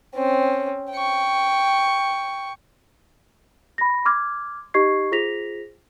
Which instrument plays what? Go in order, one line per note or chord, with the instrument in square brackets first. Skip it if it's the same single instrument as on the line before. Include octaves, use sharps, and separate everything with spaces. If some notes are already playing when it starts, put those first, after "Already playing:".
[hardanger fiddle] C4 C#4
G5 C#6
[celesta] B5 A#6
C6 D6 F6 G#6
D#4 G4 D#5 C#6 G#6 C7
F4 G#4 C5 A#6 B6 F7